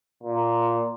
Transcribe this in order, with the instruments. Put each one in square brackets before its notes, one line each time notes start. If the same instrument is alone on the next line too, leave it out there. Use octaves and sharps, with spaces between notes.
[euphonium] A#2